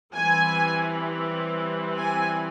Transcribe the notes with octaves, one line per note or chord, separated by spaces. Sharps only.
E3 G3 C4 G#5
G#5